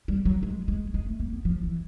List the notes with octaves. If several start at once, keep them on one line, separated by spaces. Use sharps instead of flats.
G3
F#3
G#3
G#3
G#3
A3
A#3
B3
F3
E3